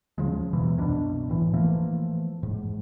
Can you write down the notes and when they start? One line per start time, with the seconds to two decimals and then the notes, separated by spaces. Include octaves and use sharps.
0.18 D#2 C#3 F3 G#3
0.53 E2 B2 E3 F#3
0.77 C2 F#2 B2 D4
1.29 A2 E3
1.53 E3 F3 A3 A#3
2.43 G#2